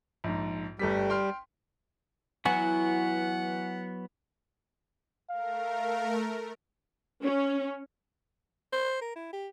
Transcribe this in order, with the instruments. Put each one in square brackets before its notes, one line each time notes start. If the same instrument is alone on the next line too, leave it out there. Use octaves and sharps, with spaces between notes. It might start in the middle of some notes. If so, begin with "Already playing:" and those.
[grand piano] A#1 G#2
[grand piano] G1 A3 B6 [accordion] G3
[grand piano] G5 C6 F6
[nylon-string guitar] E3 [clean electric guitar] F#3 B3 F#4 [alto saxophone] F#5 [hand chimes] G#5
[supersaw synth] A3 A#4 [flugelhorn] F5
[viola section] C#4
[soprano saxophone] C5
A#4
E4
G4